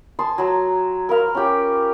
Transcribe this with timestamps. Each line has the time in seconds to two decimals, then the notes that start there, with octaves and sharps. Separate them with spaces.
0.19 G#5 A5 C6 D#6
0.38 F#3 A#5
1.09 A#4 B4 F5
1.35 C#4 F4 G4